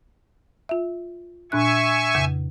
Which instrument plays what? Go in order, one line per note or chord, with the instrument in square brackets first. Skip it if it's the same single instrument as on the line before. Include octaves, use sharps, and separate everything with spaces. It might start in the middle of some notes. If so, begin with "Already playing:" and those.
[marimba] F4 E5
[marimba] A#2 D4 F#6 [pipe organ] E5 G#5 C#6
[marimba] F2 C#3 G6